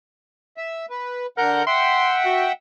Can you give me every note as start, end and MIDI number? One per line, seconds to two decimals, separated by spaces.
0.57 0.86 76
0.90 1.26 71
1.38 1.63 50
1.38 1.65 70
1.38 1.63 78
1.38 1.63 91
1.67 2.52 76
1.67 2.52 78
1.67 2.52 79
1.67 2.16 84
2.25 2.47 66